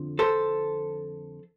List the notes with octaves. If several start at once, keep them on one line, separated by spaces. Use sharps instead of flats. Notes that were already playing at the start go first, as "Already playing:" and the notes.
Already playing: F2 D3 F3
A4 C5